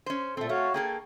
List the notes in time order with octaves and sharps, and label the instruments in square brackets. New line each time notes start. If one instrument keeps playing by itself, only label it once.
[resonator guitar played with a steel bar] C#4 C5
[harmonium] A#2 A4 [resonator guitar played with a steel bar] A3 C4
[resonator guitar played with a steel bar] A3 [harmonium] F#4 C#5 F5
[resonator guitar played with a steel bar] A#3 G#4 A4 [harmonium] G5